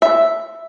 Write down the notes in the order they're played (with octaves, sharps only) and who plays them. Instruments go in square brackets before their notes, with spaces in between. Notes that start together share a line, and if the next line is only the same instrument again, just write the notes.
[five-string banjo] E5